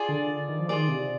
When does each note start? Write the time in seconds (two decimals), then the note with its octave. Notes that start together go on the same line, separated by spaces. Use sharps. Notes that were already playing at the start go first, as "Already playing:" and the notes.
Already playing: F4 G#4 D5
0.09 D3
0.49 D#3
0.59 F3
0.69 D#3 F4 G#4 D5
0.88 C3